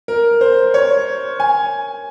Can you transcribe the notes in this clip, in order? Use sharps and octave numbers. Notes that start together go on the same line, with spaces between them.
A#4
C5
C#5
G#5